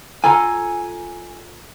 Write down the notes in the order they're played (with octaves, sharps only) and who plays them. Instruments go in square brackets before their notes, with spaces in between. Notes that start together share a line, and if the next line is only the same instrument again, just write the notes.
[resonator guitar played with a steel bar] F4 A4 A#5 [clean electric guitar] G#5